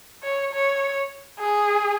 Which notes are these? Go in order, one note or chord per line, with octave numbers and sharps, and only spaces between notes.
C#5
C#5
G#4